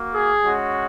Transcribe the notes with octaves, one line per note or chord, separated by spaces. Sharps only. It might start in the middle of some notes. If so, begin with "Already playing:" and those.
Already playing: A#3 F#4
G#4
G#3 C#4 F#4